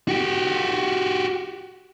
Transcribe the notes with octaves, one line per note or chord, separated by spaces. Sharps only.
F#4 G4